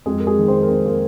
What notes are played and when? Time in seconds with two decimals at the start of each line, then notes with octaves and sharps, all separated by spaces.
0.06 F2 G#3 G#4
0.20 A#4
0.27 G#3 G#4
0.38 D#3
0.48 C4 C5
0.63 A#4
0.69 F2 C4 C5
0.85 A#3 A#4